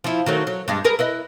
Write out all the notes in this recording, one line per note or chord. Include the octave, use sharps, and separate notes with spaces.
F3 E4
D#3 F#3 A3
F#3
G2 G#3
G#4 A#4 B4
E4 B4 D#5